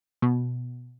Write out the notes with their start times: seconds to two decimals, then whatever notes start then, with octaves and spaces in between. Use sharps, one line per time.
0.22 B2